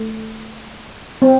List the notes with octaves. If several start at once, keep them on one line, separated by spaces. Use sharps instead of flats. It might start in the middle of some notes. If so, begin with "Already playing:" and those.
Already playing: A3
C4